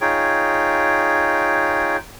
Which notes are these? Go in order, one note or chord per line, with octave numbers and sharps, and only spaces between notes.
D#4 F4 G#4 C#5 G5